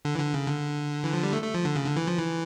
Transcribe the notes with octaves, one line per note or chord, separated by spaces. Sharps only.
D3
E3
D3
C#3
D3
E3
F3
G3
A3
A3
F3
D3
C#3
D3
E3
F3
E3